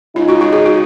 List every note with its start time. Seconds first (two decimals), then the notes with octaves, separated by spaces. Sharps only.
0.16 C#3 G#3 D#4 F4
0.29 F#4
0.41 F#4
0.53 G#4
0.65 F#4